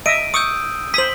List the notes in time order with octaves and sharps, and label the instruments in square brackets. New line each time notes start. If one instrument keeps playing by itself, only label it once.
[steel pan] D#5 E5 [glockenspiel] D7 D#7
[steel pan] C#6 [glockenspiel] D#6 E6 G6
[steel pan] C5 D#6 [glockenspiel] B6 F#7